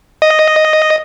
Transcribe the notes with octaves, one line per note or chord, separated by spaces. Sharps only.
D#5